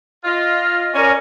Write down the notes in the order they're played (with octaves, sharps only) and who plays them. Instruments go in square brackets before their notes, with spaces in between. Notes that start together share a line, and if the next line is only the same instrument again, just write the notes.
[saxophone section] F4 [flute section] D#5
[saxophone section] C#4 [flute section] A#4 D5